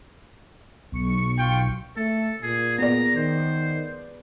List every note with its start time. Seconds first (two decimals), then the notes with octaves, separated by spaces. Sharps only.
0.92 B1 C#6 C#7
1.39 F4 G5
1.97 A3 A4
2.43 A#2 G#4
2.79 B3 G#4 D5 A#5
3.16 D#3 C5